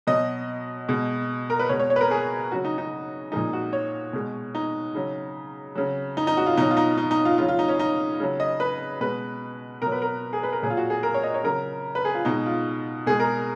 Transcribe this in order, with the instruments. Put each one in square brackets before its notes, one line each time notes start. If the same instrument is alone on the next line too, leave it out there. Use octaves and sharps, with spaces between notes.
[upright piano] B2 F#3 D#5
B2 G#3
A#4
B4
B2 G#3 C#5
C#5
C#5
B4
A#4
G#4
C#3 F#3 F#4
D#4
D#4
A#2 F3 G#3 D#4
F#4
C#5
B2 G#3
D#4
C#3 F#3
C#3 F#3
D#4
D#4
F#4
F4
B2 F#3 D#4
F4
D#4
D#4
D#4
F4
C#3 F#3 F4
F4
D#4
C#4
D#4
C#3 F#3
D#5
B4
B2 G#3 B4
B2 F#3 A#4
B4
A#4
G#4
B4
A#4
A#2 F#3 G#4
F4
F#4
G#4
A#4
C#5
D#5
C#5
C#3 F#3 A#4
B4
G#4
F4
B2 G#3 D#4
F4
B2 G#3 G#4
A#4